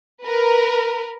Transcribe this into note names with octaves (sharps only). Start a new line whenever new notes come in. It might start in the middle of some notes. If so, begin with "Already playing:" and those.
A#4 B4